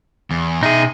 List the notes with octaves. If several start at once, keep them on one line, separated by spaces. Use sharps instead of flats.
E2
B2 D#4 G#4 E5